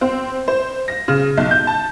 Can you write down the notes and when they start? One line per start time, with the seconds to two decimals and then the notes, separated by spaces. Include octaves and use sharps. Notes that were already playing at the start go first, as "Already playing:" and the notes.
0.01 C4
0.48 C5
0.88 A#6
1.08 C#3
1.38 B1
1.51 G6
1.67 A5